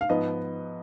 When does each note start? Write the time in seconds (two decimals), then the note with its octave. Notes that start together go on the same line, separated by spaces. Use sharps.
0.01 F5
0.09 G#2 F3 B3 D#5